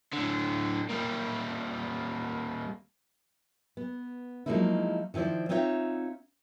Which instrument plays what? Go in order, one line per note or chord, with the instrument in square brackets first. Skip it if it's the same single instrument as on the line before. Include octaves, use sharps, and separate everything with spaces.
[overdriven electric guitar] A2 D3
G3 A#3
[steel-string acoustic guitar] B3
F3 F#3 G#3 A#3 D#4 E4
D#3 F3 E4 C5 D5
C4 D#4 F4 C#5 D5 E5